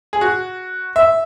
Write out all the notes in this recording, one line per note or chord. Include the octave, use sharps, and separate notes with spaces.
G#4
F#4
E5